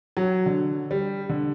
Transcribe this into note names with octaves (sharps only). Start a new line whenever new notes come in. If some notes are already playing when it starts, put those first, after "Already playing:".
F#3
D3
G3
D3